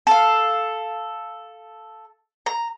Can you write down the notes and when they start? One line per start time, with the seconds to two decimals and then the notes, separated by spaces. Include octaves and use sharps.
0.07 A4 F5
2.46 A#5